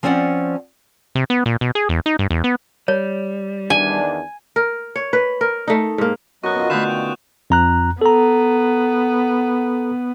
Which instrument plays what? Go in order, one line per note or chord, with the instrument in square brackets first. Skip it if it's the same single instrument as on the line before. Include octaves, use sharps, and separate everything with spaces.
[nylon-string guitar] F3 C4 C#4 D5 D#5 F#5
[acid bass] C3
B3
A#2
B2
G#4
E2
D#4
G2
E2
B3
[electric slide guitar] G3 [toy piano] C#5
[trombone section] E2 D#3 D4 [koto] G#5
[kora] A#4
C#5
B4
A#4
A3 D#4
G#2 A#3
[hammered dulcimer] F#2 C#4 [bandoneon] F#3 B3 D#5 [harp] F#4 [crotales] C#6 F#6
[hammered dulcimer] B2 D#3 F4
[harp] D3 A3 [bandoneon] F5 B5 F#6 [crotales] D#6 G6 E7
[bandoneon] G5
[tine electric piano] F2 A#5 F#6
[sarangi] B3 [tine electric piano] A4 A#5